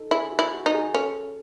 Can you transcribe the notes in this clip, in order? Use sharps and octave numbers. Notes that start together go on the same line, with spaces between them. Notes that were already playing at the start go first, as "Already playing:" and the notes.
Already playing: D#4 A4
E4 G#4
F#4
E4
F#4
D#4
G#4
C#4 A4